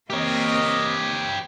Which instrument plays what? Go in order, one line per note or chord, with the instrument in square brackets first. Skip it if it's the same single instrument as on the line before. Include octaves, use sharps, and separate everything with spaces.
[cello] A#3 C4 [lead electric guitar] G4 C#5 [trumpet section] A#4 D#5